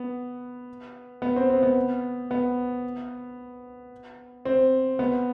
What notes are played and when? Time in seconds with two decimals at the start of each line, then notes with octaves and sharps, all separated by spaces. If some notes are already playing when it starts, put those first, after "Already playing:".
Already playing: B3
1.22 B3
1.36 C4
1.50 C4
1.63 B3
2.31 B3
4.45 C4
4.99 B3